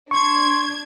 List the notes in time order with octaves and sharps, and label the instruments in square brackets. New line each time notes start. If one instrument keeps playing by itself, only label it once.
[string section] D4 G#6 [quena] C6 [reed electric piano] C#6